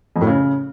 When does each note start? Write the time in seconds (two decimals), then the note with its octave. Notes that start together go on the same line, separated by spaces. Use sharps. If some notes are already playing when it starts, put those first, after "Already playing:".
0.16 F2
0.21 A2
0.27 C#3